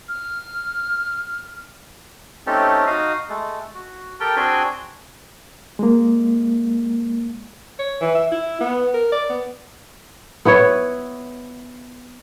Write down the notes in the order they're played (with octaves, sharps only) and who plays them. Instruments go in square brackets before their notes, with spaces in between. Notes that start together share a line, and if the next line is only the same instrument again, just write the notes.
[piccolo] F6
[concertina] A3 C4 C#4 D#4 G4 A4
D#4 F#4 D#5 F5
G#3 A3
F#4
G4 A4 A#4 G5
C4 D4 F#4 G#4 G5 G#5
[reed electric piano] G#3 A#3
[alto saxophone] C#5
E3
E5
E4
B3
A#4
D5
B3
[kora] B3 E4 B4 C#5